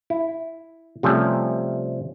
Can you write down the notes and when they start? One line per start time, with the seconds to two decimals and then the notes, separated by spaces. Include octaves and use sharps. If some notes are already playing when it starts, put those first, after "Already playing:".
0.10 E4
1.03 C3 F3 G3 A3 C#4